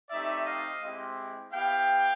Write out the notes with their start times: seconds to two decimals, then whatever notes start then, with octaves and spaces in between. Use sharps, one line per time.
0.10 A3 C4 D#4 G4 D5 E5
0.45 D#5 F5
0.81 G#3 C4 E4 G4
1.53 B3 E4 G4 F5 G5